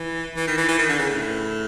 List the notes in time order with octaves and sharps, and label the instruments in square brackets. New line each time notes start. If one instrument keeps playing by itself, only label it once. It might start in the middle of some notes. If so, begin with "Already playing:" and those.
Already playing: [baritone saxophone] E3
E3
D#3
E3
E3
D#3
D3
C#3
A2